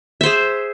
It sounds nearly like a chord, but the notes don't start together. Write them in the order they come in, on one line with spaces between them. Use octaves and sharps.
E5 C5 G#4